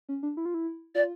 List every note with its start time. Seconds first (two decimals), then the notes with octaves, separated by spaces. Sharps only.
0.09 C#4
0.23 D4
0.37 E4
0.46 F4
0.54 E4
0.95 F4 D5